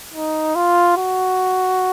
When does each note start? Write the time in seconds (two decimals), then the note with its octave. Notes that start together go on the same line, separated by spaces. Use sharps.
0.15 D#4
0.56 F4
0.97 F#4